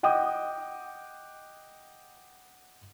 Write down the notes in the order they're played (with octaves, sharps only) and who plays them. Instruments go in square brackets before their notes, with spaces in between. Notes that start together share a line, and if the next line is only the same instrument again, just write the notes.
[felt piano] D#5 F#5 G5 D6 D#6